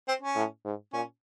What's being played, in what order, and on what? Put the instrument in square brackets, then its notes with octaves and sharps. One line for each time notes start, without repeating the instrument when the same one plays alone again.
[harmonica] C4
C#4
[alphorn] A2
G#2
[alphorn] A#2 [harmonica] C#4